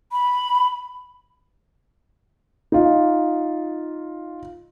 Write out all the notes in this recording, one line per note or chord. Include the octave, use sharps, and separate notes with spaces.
B5
D#4 F4